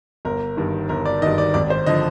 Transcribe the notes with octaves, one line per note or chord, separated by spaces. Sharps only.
G1 A#4
G2 D#3
G1 A#4
D5
G2 D#3 D#5
D5
G#1 D5
C5
D3 F3 D#5